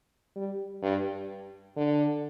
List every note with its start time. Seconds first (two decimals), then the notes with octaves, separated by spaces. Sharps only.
0.36 G3
0.82 G2
1.77 D3